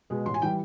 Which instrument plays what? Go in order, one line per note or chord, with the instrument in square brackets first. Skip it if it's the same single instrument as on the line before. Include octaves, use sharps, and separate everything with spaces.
[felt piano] B2 G#3 B3
A1 C6
G#5
E3 G3 G5